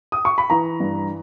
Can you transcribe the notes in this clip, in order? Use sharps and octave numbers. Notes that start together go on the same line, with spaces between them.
D#6
C#6
B5
E3 A#5
G2